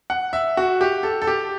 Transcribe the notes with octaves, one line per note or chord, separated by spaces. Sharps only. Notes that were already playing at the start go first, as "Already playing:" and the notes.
F#5
E5
F#4
G4
A4
A4
G4